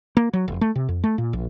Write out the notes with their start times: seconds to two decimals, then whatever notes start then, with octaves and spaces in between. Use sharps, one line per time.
0.17 A#3
0.33 F#3
0.48 F1
0.61 A3
0.76 C3
0.89 F2
1.04 A3
1.18 A#2
1.33 A#1